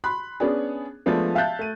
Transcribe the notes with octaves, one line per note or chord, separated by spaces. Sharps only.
B5 C6 F#6
B3 C#4 D4 G#4
F3 G#3 A3 B3 D4
E5 F5 A5 F#6 G6 A6
A3 D#7